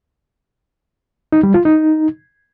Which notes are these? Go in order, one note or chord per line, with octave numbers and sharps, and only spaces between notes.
D#4
G3
F4
D#4